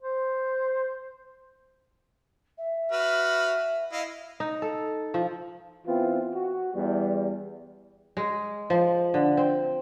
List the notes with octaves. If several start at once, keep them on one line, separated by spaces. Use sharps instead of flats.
C5
E5
F#4 B4 F6
E4 D#5 F5
D#4
A4
F3
E3 B3 C4 F4
F#4
E2 G3
G#3
F3
D3
C4